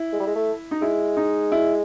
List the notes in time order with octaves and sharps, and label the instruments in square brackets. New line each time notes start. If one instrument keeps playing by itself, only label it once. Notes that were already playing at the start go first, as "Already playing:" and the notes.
Already playing: [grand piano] E4
[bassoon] G#3
G3
G#3
A3
[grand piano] D#4
[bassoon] G#3 [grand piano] E4
[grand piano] D#4
E4